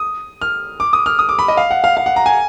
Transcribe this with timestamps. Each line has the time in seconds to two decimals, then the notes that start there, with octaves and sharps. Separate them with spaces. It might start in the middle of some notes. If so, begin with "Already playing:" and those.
Already playing: D#6
0.42 F6
0.80 D6
0.93 D#6
1.06 F6
1.19 D#6
1.29 D6
1.39 B5
1.48 D#5
1.57 F5
1.71 F#5
1.84 F5
1.97 F5
2.06 F#5
2.16 A#5
2.26 G#5